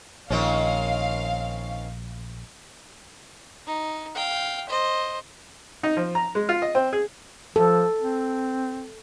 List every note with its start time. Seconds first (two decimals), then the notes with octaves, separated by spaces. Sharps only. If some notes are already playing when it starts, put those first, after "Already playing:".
0.30 A#1 D#3 C4 C#4 F5
3.67 D#4
4.15 F5 G5
4.69 C5 D#5
5.83 D#4
5.97 F3
6.15 A#5
6.35 G#3
6.49 F4
6.62 D#5
6.75 C4
6.93 G#4
7.56 F3 A4
8.01 C4